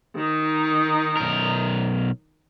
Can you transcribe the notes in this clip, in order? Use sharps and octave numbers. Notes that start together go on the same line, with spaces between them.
D#3 D#4
B1 A#4